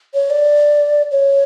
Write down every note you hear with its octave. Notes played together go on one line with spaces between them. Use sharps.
C#5
D5
C#5